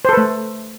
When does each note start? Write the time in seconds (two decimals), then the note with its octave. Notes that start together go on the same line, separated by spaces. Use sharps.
0.05 C5
0.09 A4
0.13 B4
0.17 A3